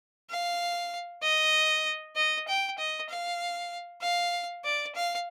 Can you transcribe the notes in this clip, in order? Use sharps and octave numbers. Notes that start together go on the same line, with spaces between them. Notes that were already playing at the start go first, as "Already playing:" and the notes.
F5
D#5
D#5
G5
D#5
F5
F5
D5
F5